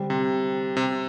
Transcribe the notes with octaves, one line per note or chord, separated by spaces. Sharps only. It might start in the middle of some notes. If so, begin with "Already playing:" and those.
Already playing: D3 G3 C4 G4 C5
C3
C3